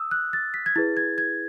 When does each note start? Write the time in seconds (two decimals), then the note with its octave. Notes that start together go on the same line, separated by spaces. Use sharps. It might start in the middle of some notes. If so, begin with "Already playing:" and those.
Already playing: D#6 E6
0.11 F#6
0.33 A6
0.54 B6
0.66 G#6
0.76 E4 G#4 B4 A6
0.97 G#6
1.18 G#6